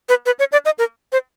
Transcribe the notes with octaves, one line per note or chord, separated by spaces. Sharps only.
B4
B4
C#5
D5
D#5
A#4
C5